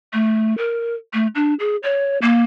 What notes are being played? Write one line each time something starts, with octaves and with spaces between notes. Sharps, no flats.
A3
A#4
A3
D4
G#4
C#5
A#3